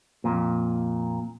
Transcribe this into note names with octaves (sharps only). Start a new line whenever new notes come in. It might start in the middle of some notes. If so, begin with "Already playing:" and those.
F2 A#2